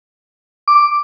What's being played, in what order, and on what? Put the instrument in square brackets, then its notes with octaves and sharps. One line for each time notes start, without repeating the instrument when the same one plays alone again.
[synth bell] D6